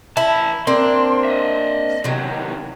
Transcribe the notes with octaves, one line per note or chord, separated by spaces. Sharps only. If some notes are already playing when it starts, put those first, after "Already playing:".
E3 E4 A5
A#3 C4 D4 C6
D#5 E5
E2 C3 D#3 F#3